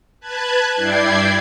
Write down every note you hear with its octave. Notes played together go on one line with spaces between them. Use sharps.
B4 A5 F#6 G#6
G2 E4 D5 G5 G#6 C7